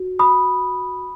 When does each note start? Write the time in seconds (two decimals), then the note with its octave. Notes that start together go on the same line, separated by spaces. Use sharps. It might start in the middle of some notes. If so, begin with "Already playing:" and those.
Already playing: F#4
0.19 B5 D#6